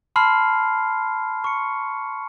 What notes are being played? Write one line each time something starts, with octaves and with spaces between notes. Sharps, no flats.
A5 B5 C6 F6 C7
C#6 C#7